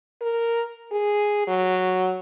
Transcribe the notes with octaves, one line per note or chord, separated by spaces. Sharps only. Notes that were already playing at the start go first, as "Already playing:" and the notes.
A#4
G#4
F#3